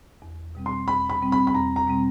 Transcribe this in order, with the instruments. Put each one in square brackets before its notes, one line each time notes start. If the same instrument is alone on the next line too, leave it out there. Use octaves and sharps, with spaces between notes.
[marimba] E2
B2 G3 C4
[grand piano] C6
[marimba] E2 [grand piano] B5
[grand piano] B5
[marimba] B2 G3 C4
[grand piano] B5
B5
[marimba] E2 [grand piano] A#5
[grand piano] A#5
[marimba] B2 G3 C4